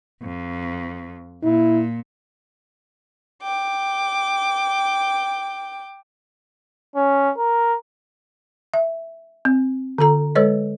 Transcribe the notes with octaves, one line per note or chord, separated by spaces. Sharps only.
F2
A#2 E4
G5 D6
C#4
A#4
E5
C4
D3 F4 A4 A#5
G#3 A4 B4 C#5 D#5